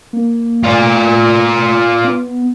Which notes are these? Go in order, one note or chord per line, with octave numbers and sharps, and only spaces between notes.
A#3
A3 F4 D5
B3